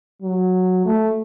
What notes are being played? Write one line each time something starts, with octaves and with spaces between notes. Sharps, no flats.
F#3
A3